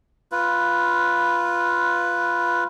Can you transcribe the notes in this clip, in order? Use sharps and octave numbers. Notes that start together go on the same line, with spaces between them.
F4 B4